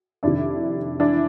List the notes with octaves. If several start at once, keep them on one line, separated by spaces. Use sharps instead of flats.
F2 C3 D#3 D4 E4
E3 D4 E4